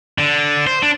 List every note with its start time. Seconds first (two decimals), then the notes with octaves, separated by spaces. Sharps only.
0.18 D3
0.67 C5
0.82 D4